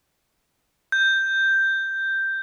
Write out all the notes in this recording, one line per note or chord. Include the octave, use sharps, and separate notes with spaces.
G6